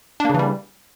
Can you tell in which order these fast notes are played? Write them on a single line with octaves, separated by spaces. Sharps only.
D4 A#3 C#3 E3 G3